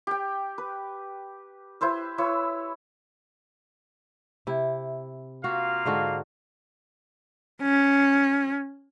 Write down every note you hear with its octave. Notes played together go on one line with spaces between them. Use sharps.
G4 G5
B4
E4 B4 C5 E5
E4 B4 C#5 E6
C3 E4
A#3 F4 F#4 F5
G#2 D3 F#4
C#4